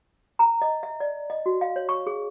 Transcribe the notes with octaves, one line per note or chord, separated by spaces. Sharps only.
A#5
D#5
E5
D5
D#5
F#4
F5
C#5
C#6
G#4